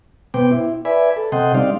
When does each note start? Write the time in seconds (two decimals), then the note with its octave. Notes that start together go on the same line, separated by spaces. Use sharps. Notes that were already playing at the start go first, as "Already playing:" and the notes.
0.34 B2 B3 C5 G5 D6
0.51 E4
0.85 B4 D5 E5 G#5 B5
1.17 A4
1.32 C3 A4 D#5 F#5 G5 C6
1.55 G3 C4 D#4 D5 F5